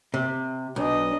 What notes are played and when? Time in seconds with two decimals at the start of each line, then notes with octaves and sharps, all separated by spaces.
0.14 C3
0.76 B1 D4 D#5